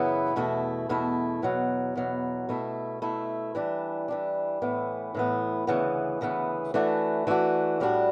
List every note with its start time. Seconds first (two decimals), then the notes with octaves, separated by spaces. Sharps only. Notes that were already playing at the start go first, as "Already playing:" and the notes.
Already playing: F#2 C#3 E3 B3 E4
0.36 E2 B2 A3 E4
0.89 E2 B2 A3 E4
1.42 E2 B2 F#3
1.96 E2 B2 F#3
2.49 B2 A3 E4
3.02 B2 A3 E4
3.55 E3 G3 D4
4.08 E3 G3 D4
4.62 A2 E3 B3
5.15 A2 E3 B3
5.67 D2 C#3 E3 B3
6.21 D2 C#3 E3 B3
6.74 E3 A3 D4 F#4
7.27 E3 A3 D4 F#4
7.80 A2 G3 D4 F#4